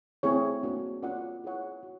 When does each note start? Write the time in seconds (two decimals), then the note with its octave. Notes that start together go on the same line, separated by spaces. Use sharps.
0.23 A3 C4 E4 G#4 C#5
0.63 A#3 D4 F#4
1.03 C#4 F4 A#4 D5 F#5
1.44 E4 G#4 C#5 F#5
1.83 F#4